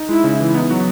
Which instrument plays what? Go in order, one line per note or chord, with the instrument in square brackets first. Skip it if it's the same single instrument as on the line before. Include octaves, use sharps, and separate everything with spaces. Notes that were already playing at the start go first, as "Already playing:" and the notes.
Already playing: [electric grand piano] D#4
[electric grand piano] G#3 [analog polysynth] E4
[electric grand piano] C#3 [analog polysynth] E4
[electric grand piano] E3
[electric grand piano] B3 [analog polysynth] D#4
[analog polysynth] F#3 [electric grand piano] F#4